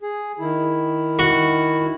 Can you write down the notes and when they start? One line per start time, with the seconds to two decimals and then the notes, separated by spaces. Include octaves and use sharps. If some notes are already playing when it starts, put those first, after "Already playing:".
0.02 G#4
0.39 D#3 E4
1.19 F#4